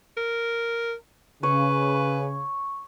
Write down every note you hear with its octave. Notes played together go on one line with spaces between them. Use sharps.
A#4
C#3 B4 C#5